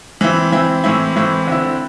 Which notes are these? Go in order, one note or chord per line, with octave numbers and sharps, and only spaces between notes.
E3 C4 E4
E3 C4 E4
A2 E3 C4 E4
A2 E3 C4 E4
D3 C4 E4